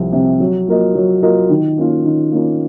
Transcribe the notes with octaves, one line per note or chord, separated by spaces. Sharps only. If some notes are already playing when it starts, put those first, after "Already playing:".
Already playing: C2 C3 F3 C4
C3 F3 C4
F#3
A#3 F4 A#4 D#5
F#3
A#3 F4 A#4 D#5
D#3
A#3 C#4 F4
D#3
A#3 C#4 F4